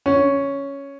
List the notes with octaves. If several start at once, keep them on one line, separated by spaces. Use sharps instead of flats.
C#4